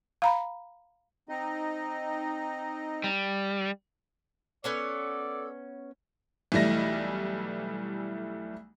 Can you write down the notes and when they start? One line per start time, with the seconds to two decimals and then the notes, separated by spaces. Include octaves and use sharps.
0.22 F5 A#5 B5
1.29 C4 D#4 D#5
3.04 G3
4.64 B3 C#4 A4 C#5 D5
6.52 B1 E3 G3 A3 A#6